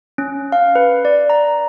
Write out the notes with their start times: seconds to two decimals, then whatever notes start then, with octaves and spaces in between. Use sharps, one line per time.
0.18 C#4
0.52 F5
0.75 B4
1.05 D5
1.30 A#5